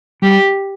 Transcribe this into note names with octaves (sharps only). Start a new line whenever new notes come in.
G3 G4